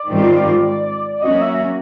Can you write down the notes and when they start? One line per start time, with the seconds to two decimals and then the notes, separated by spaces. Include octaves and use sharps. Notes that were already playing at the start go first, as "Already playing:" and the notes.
Already playing: D5
0.09 G#2 D#3 G3 C4 F4
1.22 F#3 A#3 C#4 F#4 D#5
1.42 E5